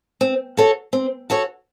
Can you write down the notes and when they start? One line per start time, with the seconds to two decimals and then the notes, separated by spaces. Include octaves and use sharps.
0.21 C4
0.57 F#4 A4 C#5
0.93 C4
1.30 F#4 A4 C#5